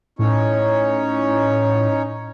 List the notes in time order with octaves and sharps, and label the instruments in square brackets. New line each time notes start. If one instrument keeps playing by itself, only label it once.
[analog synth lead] A2 [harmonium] C#4 D#4 C#5